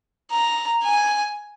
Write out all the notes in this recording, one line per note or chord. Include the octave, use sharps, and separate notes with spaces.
A#5
G#5